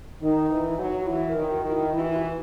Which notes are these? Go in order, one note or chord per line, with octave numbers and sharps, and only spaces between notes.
D#3 D#4
E3
F#3
F#4
E3 E4
A#4
D#3
F#4
D#3 F#4
E4
E3 E4
F#4
E4
F#4
E4